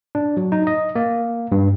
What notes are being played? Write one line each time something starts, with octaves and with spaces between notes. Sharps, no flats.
D4
F#3
D#4
D#5
A#3
G2